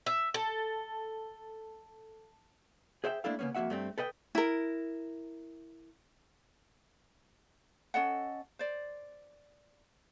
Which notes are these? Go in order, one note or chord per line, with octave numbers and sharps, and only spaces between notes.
E5
A4
G#4 C5 E5 F#5 G5
A3 A#3 D4 E4 A4 F5
C#3 F#3 A#3 B3 C#4
F2 A#3 F#4 E5 F#5
G2 A3 C4
A4 B4 D#5 G5
E4 A#4
C#4 A4 D#5 F#5
C5 D5